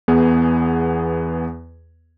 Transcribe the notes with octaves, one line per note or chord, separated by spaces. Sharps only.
E2 B3 G#4